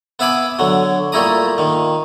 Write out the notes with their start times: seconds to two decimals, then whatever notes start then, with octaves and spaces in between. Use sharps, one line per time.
0.19 B3 E5 F5 G#5 B5 D6
0.59 D3 F#3
1.12 A#2 G3 A3 E4 A#5 D#6
1.58 A#2 D#3